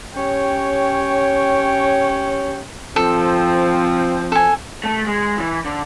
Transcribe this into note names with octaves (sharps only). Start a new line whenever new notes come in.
C#4 G4 C#5 G5
F3 C4 A4
A4 G#5
A3
G#3
E3
D3